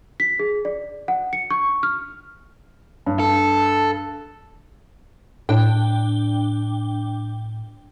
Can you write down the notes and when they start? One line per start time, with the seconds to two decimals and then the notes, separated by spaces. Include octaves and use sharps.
0.20 B6
0.39 G#4
0.65 D5
1.08 F#5
1.33 C#7
1.50 C#6
1.83 F6
3.06 G2
3.19 A4
5.49 A2 D4 G5